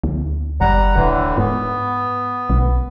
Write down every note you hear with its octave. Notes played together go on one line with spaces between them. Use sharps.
D2
F#1 G3 F#5 A#5
D1 A2 D3 E3
G#2 B3
B1